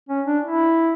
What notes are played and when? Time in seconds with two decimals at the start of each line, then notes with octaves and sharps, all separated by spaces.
0.09 C#4
0.26 D4
0.44 E4